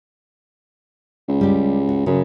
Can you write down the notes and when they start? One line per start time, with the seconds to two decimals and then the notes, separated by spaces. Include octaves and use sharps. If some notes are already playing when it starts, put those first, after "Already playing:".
1.28 C#2
1.41 G3 G4
1.89 F#4
2.06 F#2 C#3